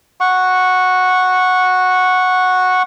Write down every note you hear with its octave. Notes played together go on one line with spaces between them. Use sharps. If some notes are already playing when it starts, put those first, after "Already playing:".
F#5 C#6